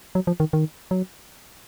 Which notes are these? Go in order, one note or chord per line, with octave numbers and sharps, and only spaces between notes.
F#3
F3
D#3
D#3
F#3